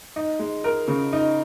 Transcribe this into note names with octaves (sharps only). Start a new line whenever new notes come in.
D#4
G#3
A#4
C#3
D#4